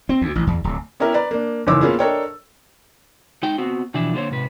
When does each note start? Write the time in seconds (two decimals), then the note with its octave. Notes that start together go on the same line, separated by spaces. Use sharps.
0.09 C4
0.22 D2
0.35 A1
0.47 E2
0.64 D1
1.00 B3 C#4 E4 G4 A#4
1.14 B4 D5 A#5
1.31 A#3 D4
1.67 F#1 E2 G#2 C#5 D6 E6
1.81 A#3 B3 C#4 F4 G#4
1.99 D4 A4 A#4 C#5 D#5 G5
3.43 G#3 D#4 G5
3.58 B3 C4 F#4
3.94 B2 E3 F3 D4 E4
4.14 D3 A#3 G4 C5 C#5
4.30 G#2 C3 B4